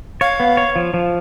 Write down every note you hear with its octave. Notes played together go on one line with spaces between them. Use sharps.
C#5 F5
B3
C#5
F3
F3